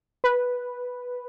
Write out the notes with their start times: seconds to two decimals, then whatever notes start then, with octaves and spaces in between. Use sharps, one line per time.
0.24 B4